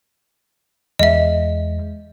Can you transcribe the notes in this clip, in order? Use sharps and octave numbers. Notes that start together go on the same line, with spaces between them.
E2 G#3 D#5 E5